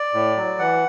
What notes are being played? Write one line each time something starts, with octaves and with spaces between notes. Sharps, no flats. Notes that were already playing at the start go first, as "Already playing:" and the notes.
Already playing: D5
A2
F#3
E3 F#5